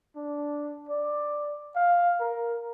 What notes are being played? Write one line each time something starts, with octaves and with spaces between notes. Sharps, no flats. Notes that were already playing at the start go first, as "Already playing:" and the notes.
D4
D5
F5
A#4